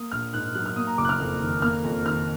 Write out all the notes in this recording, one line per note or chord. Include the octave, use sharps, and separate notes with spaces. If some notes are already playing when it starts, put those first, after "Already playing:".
Already playing: A#3 D#6
A#1 F6
G#2 F#6
F#3 F#6
F6
A#3 D#6
A#5
F#1 D6
F#6
F6
F2
D#3
A#3 F6
F2
D#3 F6